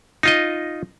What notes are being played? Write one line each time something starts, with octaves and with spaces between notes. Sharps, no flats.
D#4 F4 D#5